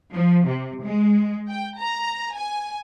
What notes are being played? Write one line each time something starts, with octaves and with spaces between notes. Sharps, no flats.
F3
C3
G#3
G5
A#5
G#5